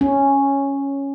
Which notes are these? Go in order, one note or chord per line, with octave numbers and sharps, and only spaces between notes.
C#4